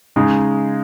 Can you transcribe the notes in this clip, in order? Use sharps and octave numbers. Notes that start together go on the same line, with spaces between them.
C#3 G#3 D#4